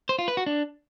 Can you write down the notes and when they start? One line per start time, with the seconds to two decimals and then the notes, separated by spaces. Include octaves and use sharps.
0.09 C5
0.19 F4
0.28 B4
0.37 F#4
0.46 D4